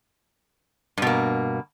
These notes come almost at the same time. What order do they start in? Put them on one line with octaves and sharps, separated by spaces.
G2 B2 A#3